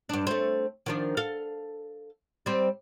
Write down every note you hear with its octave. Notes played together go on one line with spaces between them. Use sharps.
G2 D4
A3 C4
D#3 F3 D4
A4 F5
G3 C4